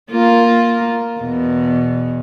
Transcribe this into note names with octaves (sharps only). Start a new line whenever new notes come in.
A#3 F4
E2 B2